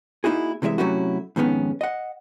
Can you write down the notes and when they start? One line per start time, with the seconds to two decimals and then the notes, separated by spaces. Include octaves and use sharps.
0.24 A#3 D#4 E4 F#4 G#4
0.62 C3 E3 G#3 D5 E5
0.78 C3 F#3 A3 C#4 E4 F#4
1.36 F2 G#2 D#3 B3 C#4
1.81 D#5 F#5